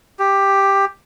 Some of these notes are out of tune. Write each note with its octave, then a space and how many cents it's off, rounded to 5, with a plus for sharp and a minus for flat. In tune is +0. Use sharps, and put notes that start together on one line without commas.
G4 +5